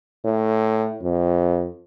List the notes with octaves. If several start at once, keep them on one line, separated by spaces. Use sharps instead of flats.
A2
F2